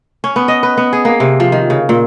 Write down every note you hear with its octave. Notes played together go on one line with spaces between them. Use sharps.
C#4
B3
D#5
B4
B3
G#4
A#3
C3
F3
D#3
C#3
A#2